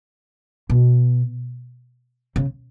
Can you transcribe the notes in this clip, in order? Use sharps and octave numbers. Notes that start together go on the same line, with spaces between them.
B2
C#3